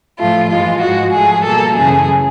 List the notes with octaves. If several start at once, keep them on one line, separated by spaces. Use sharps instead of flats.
A2 F3 A3 F4
G2 E3 G#3 F4
G#2 F3 G#3 F#4
G#2 F3 A3 G#4
B2 G3 A#3 A4
F#2 C#3 E3 A3 G#4